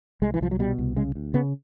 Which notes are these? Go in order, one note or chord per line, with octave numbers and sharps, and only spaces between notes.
C2 G#3
E3
C2 F3
F#3
B2 G3
C2
C#3 G#3
D2
C#3 B3